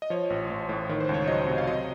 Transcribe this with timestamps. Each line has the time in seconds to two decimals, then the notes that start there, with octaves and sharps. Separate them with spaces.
0.02 D#5
0.10 F3 C#5
0.30 A1
0.50 A1
0.69 A2
0.89 D#3
1.00 C5
1.09 C#2
1.14 C#5
1.27 F#3 D#5
1.47 C3
1.58 F5
1.66 F#3 D#5